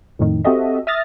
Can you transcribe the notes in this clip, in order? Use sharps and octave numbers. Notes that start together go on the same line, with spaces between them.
F2 A2 D#3
C4 F#4 G4 A4 D#5 E5
E5 D#6 F6 A6 A#6